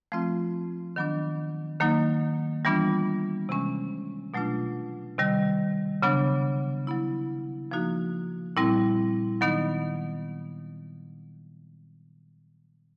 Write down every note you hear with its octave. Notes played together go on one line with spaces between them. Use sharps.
F3 A3 C4 F4
D#3 F#3 B3 D4
D#3 F#3 A#3 D#4
E3 G3 B3 D4 F4
C3 E3 G#3 C#4
B2 F#3 A3 D4 F4
C3 D#3 G3
C#3 F#3 B3 D4
F#3 B3 E4
F3 A#3 D#4 F#4
A#2 G3 C4 E4
D#3 F#3 B3 D#4